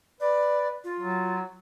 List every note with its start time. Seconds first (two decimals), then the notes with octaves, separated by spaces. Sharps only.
0.20 B4 D5
0.84 F4
1.00 F#3